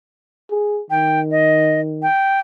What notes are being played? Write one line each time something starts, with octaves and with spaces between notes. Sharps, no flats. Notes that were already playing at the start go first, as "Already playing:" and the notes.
G#4
D#3 G5
D#5
G5